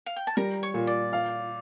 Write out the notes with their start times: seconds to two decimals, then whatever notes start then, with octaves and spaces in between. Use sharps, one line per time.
0.06 F5
0.16 G5
0.27 A5
0.37 G3 A#4 A#5
0.63 C#5 C#6
0.74 A#2
0.87 D5
1.13 F5